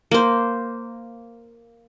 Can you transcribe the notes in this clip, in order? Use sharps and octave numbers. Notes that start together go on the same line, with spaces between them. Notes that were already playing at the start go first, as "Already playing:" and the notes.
A#3 C5